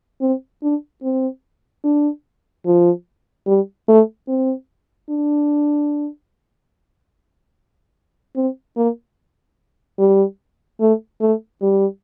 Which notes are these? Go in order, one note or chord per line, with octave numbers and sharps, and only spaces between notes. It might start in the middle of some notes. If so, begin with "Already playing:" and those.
C4
D4
C4
D4
F3
G3
A3
C4
D4
C4
A#3
G3
A3
A3
G3